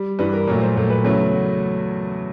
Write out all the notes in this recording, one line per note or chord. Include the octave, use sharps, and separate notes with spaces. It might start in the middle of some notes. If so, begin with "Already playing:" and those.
Already playing: G3
G2 E3 G3 B4
A#4
A#2 F#3 A3 C#5
C5
A#2 F#3 A3
B4
E2 C#3 F#3 A3